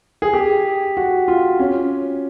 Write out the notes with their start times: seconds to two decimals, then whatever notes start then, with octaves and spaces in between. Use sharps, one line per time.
0.22 G#4
0.33 G4
0.97 F#4
1.28 F4
1.59 C#4